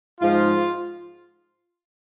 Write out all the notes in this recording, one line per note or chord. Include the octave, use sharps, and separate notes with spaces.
G#2 F3 F4